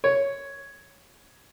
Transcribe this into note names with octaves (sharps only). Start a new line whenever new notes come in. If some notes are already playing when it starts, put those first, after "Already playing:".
C#5